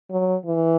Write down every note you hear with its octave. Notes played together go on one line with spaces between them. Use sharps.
F#3
E3